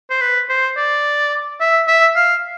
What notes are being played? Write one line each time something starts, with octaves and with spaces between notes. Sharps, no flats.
C5
B4
C5
D5
E5
E5
F5